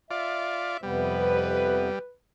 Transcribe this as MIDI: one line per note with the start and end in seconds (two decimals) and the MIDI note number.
0.11 0.77 65
0.11 0.77 74
0.11 0.81 76
0.83 1.89 41
0.83 1.89 48
0.83 1.99 55
0.83 1.89 59
0.83 2.14 71